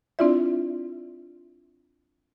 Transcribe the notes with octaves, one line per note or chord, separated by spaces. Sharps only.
C4 D4 E4 F4 D5 E5